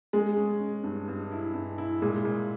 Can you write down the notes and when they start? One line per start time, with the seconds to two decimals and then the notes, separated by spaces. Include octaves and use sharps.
0.13 G#3 C#4
0.37 C#4
0.60 C#4
0.84 G2
1.08 G2
1.32 E4
1.54 G2
1.78 E4
2.02 A#2 G#3
2.25 A#2